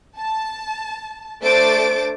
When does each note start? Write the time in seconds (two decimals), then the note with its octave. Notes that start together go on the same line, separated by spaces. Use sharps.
0.19 A5
1.43 A3 D4 C5 D6 A6 D7